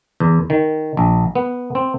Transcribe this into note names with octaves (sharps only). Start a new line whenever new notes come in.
E2
D#3
A#1
B3
C4